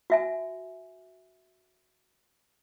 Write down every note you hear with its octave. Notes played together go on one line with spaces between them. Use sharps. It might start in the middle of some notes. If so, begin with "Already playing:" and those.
F#4 E5 G#5